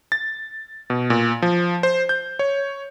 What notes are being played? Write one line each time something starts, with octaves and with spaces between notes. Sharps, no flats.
A6
B2
A#2
F3
C5
G6
C#5